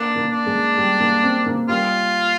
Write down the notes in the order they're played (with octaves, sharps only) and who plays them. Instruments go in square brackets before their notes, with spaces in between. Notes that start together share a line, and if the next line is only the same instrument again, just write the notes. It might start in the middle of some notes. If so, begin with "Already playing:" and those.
Already playing: [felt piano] A#3 [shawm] D4
[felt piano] A#3
[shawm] D4
[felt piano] G#3
G3
A#3
C4
A#3
[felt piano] G3 [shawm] F4